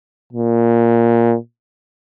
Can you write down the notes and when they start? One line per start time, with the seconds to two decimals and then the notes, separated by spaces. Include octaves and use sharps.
0.33 A#2